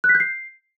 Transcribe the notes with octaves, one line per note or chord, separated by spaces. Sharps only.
F#6
B6
G6
C7